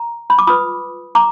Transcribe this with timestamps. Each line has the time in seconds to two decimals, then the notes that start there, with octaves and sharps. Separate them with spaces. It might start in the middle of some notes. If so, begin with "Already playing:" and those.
Already playing: A#5
0.30 B5
0.39 D6
0.47 F4 B4 B5 D#6
1.15 A#5 D6